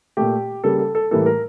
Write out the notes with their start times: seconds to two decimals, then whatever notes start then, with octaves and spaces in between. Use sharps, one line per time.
0.17 A#2 A3 G4
0.64 C#3 G3 A#3 A4
0.79 A4
0.95 A4
1.11 A2 E3 G3 A#3 A4
1.26 A#4